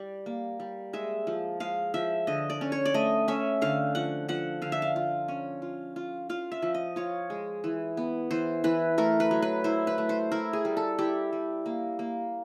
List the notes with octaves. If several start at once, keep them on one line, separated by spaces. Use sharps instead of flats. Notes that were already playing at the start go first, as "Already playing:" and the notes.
Already playing: G3 D5
A#3
G3
G#3 E5
F3
G#3 F5
F3 E5
D3 D#5
D5
C#4
C#5
D5
A3 D#5
C#4 E5
D3 F5
F3 F#5
F3 F#5
D3 F5
E5
F5
F4
C#4
F4
F4
F4 F5
E5
F3
D#5
F4 C#5
G#3
E3
B3
E3 C5
E3 B4
A3 A#4
B4
F#3
B4
E4 C5
B4
A3
C5
E4 A#4
G#4
G3
A4
E4 G4
G3
A#3
A#3